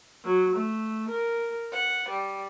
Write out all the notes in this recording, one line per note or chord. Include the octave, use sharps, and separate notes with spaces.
F#3
A3
A#4
F#5
G3